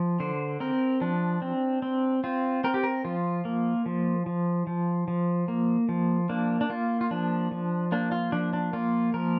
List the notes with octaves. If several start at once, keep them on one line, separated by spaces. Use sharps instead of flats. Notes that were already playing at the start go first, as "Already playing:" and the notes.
Already playing: F3
D3 C5
C4 A#4
F3 D4
C4
C4
C4 F4
C4 A#4
G4
A#4
F3 F4
A#3
F3
F3
F3
F3
A#3
F3
A#3 D4
D4
A#3 F4
F4
F3 D4
F3
A#3 D4
F4
F3 D4
D4
A#3 F4
F3 A#4